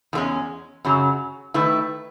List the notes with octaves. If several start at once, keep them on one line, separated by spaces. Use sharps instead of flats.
E2 D#3 G#3 C#4
F#2 C#3 F#3
D#3 A3 E4 B4